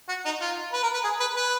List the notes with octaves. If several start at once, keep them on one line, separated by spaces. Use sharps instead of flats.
F#4
D#4
F4
B4
A#4
B4
G#4
B4
B4